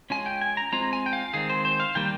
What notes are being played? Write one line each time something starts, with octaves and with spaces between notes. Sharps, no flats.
G#3 C#4 F4 G#5
G5
G#5
A#5
G#3 C4 F4 A#5
G#5
G5
F5
D#3 G#3 C4 G#4
C5
C5
F5
D#3 G3 A#3 G5